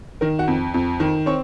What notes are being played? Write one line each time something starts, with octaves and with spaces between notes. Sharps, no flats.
D#3 A#4
F#4 F#5
F2
F2
D#3
C4 C#5 C#6